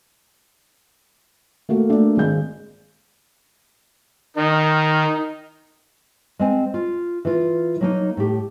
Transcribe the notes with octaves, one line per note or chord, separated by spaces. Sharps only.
A3 A#3 F#4 A4
A3 A#3 D4
G#1 G#3 G6
D#3 D#4
G#3 C4 G#5
F4
E3 F4
F#3 A#3 D#4
A2 G4